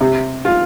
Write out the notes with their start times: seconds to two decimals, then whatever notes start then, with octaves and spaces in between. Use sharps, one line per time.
0.01 C3
0.45 F4